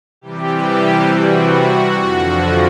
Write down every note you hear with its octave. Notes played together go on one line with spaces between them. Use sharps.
C3 E3 G3 G4
F#4
F2 D3 F3